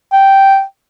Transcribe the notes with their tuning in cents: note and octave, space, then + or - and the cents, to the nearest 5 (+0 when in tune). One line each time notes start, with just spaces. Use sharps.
G5 -5